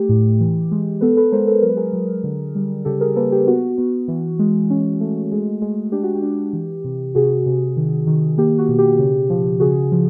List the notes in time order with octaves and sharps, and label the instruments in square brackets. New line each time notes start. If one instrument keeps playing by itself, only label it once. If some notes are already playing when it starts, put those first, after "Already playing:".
Already playing: [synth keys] A3 G4
A2
E3
G#3
B3 A4 B4
A4 B4
G#3 A#4 C5
A4 B4
F#3 A#4
B4
G#4 A#4
F#3
D3
G3
C#3 G4 A4
G#4 A#4
A#3 A4 B4
G4
B3 F#4
B3
E3
G#3
C#4
A3
G#3
G#3
D4 G4
F#4
G4
D4
E3
C3
C3 F#4 G#4
C3
D#3
D#3
A#3 G4
F#4
B2
G4
C#3
F3
C#3 F#4 G#4
F3